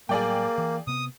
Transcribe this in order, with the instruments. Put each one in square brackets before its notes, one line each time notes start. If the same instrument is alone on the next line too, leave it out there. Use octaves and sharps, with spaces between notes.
[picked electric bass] A2 F#3 G3 [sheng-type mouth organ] A#3 [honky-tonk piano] G#4 D5 G5
[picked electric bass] E3
[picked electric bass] C3 B3 [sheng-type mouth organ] D#6